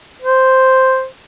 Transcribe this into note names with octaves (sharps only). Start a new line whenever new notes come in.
C5